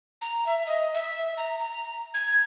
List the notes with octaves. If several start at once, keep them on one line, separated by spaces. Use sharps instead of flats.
A#5
E5
D#5
E5
A#5
A#5
G#6